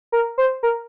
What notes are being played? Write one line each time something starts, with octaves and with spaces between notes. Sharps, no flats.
A#4
C5
A#4